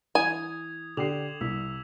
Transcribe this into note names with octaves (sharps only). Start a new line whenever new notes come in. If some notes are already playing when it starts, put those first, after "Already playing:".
E3 G#5 D#6 G#6
D3 G4 D6 C7 F7 F#7
C2 E6 B6